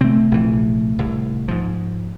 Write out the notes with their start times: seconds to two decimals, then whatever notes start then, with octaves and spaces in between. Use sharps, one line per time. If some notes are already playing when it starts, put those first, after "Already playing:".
0.01 C3 A3 C4
0.32 A#1 E3
0.99 C2 A2
1.48 G#2 F3